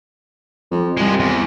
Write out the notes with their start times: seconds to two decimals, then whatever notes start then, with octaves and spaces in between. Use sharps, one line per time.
0.71 F2
0.97 C2 F3 G#3
1.20 E2